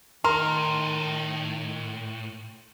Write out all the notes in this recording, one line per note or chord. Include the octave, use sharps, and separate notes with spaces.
A2 D#3 A#4 C6